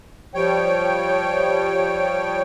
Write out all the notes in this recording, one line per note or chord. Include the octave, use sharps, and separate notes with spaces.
F3 G3 C#5 G5